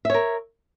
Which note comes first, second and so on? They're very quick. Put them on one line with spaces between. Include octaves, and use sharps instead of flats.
E5 C#5 A#4